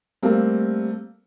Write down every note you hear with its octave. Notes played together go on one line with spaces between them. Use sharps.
G3 A3 A#3 C4